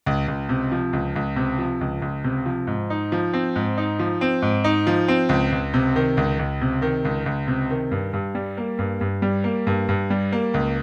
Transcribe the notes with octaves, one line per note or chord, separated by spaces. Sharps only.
C#2
C#2
C3
F3
C#2
C#2
C3
F3
C#2
C#2
C3
F3
G#2
D#4
F3
C4
G#2
D#4
F3
C4
G#2
D#4
F3
C4
C#2
C#2
C3
D#3
C#2
C#2
C3
D#3
C#2
C#2
C3
D#3
G2
G2
G3
A#3
G2
G2
G3
A#3
G2
G2
G3
A#3
C#2